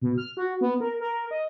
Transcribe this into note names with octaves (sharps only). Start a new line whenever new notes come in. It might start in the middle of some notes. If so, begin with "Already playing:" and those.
B2
F6
F#4
B3
A#4
A#4
D#5